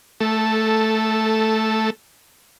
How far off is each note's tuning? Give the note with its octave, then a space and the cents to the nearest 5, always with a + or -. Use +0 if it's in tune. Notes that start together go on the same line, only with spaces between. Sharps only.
A3 -5 A4 +0